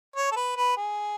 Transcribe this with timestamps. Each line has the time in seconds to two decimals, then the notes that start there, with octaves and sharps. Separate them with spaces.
0.16 C#5
0.32 A4
0.36 B4
0.56 B4
0.77 G#4